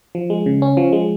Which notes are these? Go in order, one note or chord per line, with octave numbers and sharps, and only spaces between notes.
F3
G#3
C#3
C#4
F3
G#3